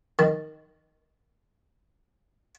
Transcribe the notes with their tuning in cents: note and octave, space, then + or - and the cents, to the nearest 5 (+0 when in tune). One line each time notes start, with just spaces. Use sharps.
D#3 +0 A5 +0